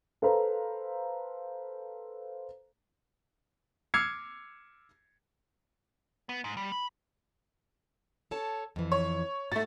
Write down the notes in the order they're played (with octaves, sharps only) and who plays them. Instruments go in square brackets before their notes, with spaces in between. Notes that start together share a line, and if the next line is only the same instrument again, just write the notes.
[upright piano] A4 B4 C5 F5 A#5
[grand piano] D6 E6 F6 G#6 C7 C#7
[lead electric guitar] B3
G#2
G3
B5
[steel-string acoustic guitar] A4 C#5 A5
F2 E3
[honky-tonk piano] C#5
[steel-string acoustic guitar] G#2 F#4 [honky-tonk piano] A3 A6